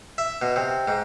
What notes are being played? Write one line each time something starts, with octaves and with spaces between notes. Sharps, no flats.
E5
B2
C3
G#2